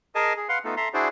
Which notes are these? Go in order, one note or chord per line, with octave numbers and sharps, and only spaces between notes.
G#4 A#4 D#5 G#5 A5
G#4
B4 F5 F#5 C6
A3 B3 D#4 F4 A4
A4 E5 A#5 C6
D4 E4 F#4 G#4 C5 D5